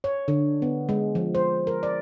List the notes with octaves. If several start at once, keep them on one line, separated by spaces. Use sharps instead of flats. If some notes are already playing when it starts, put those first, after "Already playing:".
C#5
D3
B3
G#3
F3
C5
A#4
D5